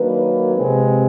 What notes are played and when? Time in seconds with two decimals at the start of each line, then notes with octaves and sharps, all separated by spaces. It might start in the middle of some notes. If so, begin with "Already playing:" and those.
Already playing: D#3 F#3 A#3 D4 B4
0.55 C3 F3 G#3 C4